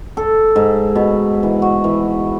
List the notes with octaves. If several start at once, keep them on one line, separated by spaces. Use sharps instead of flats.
A4
G#2
B2
E3
F#4
E3